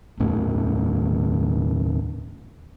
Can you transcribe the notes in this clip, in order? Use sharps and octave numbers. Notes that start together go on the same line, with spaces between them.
D#2 A2 A3 C#4